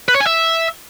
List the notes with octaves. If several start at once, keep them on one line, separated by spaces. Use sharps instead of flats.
B4
C#5
G#5
E5